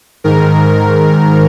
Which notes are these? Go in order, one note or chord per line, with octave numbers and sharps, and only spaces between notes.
G#2 D#3 A#4